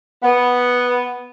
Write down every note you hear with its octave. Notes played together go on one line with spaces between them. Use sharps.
B3